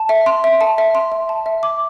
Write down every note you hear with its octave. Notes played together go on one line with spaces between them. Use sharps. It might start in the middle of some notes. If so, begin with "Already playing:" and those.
Already playing: A5
E5
C6
E5
A5
E5
C6
E5
A5
E5
D6